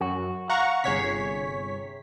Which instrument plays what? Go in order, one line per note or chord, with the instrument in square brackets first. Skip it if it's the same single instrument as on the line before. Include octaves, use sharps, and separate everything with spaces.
[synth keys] F#2 [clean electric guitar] F#4
[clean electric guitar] F5 [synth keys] F#5 A#5 C#6
[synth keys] G1 C#5 B6 [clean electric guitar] C3 G#4